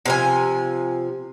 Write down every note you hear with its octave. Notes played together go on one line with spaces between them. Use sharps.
C3 F3 G#5